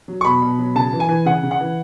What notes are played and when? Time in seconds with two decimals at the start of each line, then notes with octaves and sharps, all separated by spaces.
0.08 F#3
0.21 C#6
0.25 B2 B5
0.42 B2
0.59 F#3
0.75 C#3 A5
0.93 E3
1.00 G#5
1.09 E3
1.25 C#3 F#5
1.43 C#3
1.51 F#5
1.60 E3